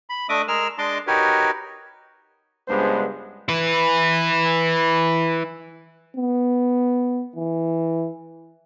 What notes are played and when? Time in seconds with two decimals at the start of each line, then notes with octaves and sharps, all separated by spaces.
0.10 B5
0.29 A3 D4 D#5 E5 D6 D#6
0.48 G#3 G#4 A#4 E6 F6
0.78 G#3 D4 D#5 A5 C6 D6
1.07 D#4 F#4 G4 A#4 B4 C#5
2.68 C#2 G2 G#3 B3 D4 C5
3.49 E4 B4
6.16 B3
7.36 E3